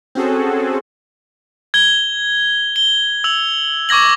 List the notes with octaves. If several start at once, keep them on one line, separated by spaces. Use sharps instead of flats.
C4 C#4 F#4 G#4 A4
G#6 G7
G7
E6 F7
C#6 D6 G#6 A#6 F#7